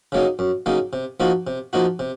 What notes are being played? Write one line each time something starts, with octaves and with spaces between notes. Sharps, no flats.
C#3 F#3 A#3 D#4
F#2
C#3 F#3 A#3 D#4
C3
F3 A#3 D#4 F#4
C3
F3 A#3 D#4 F#4
C3